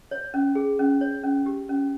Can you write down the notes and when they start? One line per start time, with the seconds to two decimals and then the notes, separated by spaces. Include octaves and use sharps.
0.11 C#5
0.34 C#4
0.55 G#4
0.79 C#4
1.01 C#5
1.23 C#4
1.46 G4
1.69 C#4